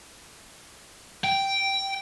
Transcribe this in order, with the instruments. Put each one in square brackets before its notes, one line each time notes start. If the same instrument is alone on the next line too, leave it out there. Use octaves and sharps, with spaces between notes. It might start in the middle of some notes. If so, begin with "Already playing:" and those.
[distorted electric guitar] G5